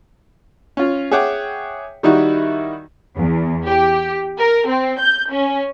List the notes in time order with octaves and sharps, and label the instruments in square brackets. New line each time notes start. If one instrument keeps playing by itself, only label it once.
[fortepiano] C#4 F4
G#4 C#5 E5 F#5 G5 D6
D#3 G3 D#4 E4 F#4
[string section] E2
G4
A#4
C4
G6
C#4